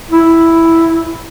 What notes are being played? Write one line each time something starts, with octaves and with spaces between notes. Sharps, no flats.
E4